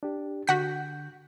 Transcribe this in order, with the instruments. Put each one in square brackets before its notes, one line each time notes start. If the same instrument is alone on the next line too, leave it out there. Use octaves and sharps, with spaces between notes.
[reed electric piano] D4 G4
[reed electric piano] D3 G6 [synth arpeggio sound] F#4 F#5 B6